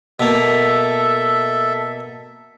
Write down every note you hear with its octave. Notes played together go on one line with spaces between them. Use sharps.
B2 A#3 A4 E5